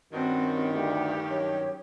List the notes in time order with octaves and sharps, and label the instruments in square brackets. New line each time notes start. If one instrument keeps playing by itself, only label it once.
[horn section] G2 D#3 [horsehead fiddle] C4 F#4 [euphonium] C#4
[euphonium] D2 [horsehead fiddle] G4
[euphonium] F#2 [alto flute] C#5